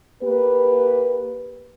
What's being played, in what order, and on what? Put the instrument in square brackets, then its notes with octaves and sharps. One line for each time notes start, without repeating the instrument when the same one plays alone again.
[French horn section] A#3 G4 B4